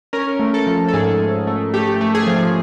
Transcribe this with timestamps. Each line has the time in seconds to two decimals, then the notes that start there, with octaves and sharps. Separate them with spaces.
0.13 C#4 A#4
0.39 A3
0.54 A4
0.67 F3
0.88 A4
0.93 G#2 G#4
1.20 G#2
1.47 A3
1.74 A3 G4
2.01 A3
2.15 G#4
2.27 F3